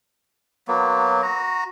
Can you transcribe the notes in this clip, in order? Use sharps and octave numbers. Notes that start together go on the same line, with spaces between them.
F#3 A#3 B3
F#4 A#5